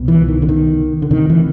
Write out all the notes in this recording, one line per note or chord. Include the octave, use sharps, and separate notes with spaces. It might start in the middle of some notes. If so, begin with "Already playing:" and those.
Already playing: C2 B2
E3
D#3
D3
D#3
D3
D2 C3 D#3
E3